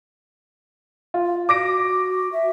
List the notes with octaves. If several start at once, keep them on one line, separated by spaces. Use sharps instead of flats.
F4
F#4 D6 A#6 D7
E5